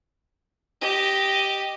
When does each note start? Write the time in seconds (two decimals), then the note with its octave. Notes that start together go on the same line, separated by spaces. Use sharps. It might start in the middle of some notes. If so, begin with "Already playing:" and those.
0.81 G4 D#5